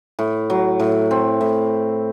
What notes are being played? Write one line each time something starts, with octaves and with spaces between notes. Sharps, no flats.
A2
F#3
A2
C4
A2